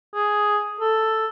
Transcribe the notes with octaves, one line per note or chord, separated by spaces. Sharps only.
G#4
A4